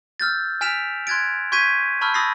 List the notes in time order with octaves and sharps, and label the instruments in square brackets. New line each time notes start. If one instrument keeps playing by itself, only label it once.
[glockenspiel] E6 F6 G6 A6
G#5 F6 B6 D7 E7 F7
C6 F#6 G#6 A6 D7
C6 C#6 G6 G#6 B6 D#7
A5 B5 C#6 E6 F6 G6
B5 D#6 E6 A6 A#6 C7